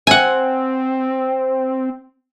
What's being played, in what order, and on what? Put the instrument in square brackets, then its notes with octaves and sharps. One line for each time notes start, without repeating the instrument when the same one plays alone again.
[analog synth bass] C4 [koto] F#5 G#5